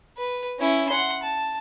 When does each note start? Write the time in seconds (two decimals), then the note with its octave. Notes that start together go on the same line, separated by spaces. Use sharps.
0.17 B4
0.59 C#4 E4
0.89 F#5 C6
1.23 A5